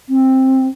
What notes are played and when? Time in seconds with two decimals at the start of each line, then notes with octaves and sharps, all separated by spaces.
0.09 C4